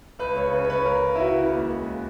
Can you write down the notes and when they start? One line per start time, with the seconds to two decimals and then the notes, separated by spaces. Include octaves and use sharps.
0.19 C#2 B4
0.36 C#3 C#5
0.53 C#3 B4
0.65 C#5
0.70 C#2 B4
0.85 C#3 A#4
1.03 C#3
1.16 E4
1.20 C#3 F#4
1.37 C#3
1.52 D#2
1.70 G#3